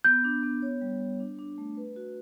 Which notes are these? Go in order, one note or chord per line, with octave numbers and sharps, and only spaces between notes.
B3 G6
D4
B3
C#5
G3
G3
D4
D4
A3
B4
F#4